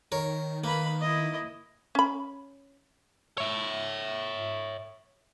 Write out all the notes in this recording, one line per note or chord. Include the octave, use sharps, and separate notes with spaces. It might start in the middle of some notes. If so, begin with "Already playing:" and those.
D#3 A#4 C#5
A#3 B4 B5
E4 D#5
C#4 B5
C#5 E5